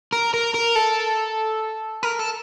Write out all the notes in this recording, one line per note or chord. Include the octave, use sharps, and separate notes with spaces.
A#4
A#4
A#4
A4
A#4
A4